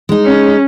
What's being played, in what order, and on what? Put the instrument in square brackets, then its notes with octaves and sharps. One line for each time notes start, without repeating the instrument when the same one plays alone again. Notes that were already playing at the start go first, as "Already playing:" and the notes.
[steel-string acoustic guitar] G#3 D#4
[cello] C#4